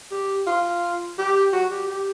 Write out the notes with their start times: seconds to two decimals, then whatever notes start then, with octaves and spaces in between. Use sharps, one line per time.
0.11 G4
0.47 F4
1.18 G4
1.53 F#4
1.71 G4
1.88 G4